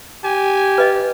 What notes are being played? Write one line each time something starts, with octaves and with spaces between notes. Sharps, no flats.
G4 G#5
B4 D#5